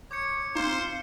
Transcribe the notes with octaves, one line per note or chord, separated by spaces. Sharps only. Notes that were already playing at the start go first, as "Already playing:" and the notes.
C#5 D6 G6 C#7
C4 D#4 F4 C5